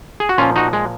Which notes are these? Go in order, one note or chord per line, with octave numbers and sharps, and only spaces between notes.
G#4
F#4
A#2 F3 C#4 F4
D#4 F#4
G#3